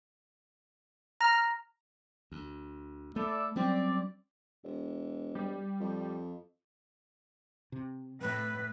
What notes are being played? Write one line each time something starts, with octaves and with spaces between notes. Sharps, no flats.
A#5 F6 A#6
D2
A3 E4 A4 D5
F#3 G3 C4 C#4 D5
E1
G3
F2
C3
A2 B4